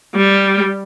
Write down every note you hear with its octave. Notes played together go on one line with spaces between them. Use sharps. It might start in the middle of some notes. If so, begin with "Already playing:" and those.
G3